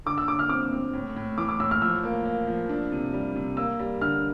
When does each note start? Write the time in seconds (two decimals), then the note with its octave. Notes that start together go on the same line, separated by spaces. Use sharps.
0.06 D3 D6
0.18 E6
0.28 D3 D6
0.39 F6
0.49 C4 D6
0.72 C4
0.93 A2
1.16 A2
1.38 E3 D6
1.49 D6
1.60 A2 E6
1.71 F6
1.81 F3 E6
2.04 A#3
2.25 A#3
2.47 F3
2.69 D4
2.92 C3
3.13 G3
3.36 C3
3.57 A#3 E6
3.79 G3
4.01 D3 F6